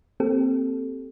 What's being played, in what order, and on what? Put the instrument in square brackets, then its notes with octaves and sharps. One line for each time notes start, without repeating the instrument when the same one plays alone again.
[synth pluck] A#3 C4 G4 A4